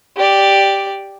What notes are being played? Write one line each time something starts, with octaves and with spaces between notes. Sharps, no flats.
G4 D5